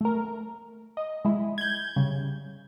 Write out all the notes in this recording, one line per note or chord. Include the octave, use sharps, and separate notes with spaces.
A3 A#4
D#5
G#3 E4
G6 G#6
C#3 G3